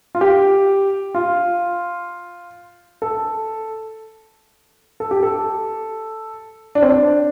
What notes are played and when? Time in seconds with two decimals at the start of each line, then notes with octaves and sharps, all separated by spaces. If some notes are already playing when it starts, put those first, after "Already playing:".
0.15 F4
0.21 G4
1.15 F4
3.02 A4
5.00 A4
5.11 G4
5.23 A4
6.75 D4
6.82 C4
6.89 D4